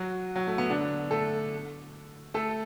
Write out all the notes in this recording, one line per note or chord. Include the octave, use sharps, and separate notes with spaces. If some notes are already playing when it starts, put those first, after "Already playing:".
Already playing: F#3 F#4
F#3
A3
B3
D3 D4
A3 A4
A3 A4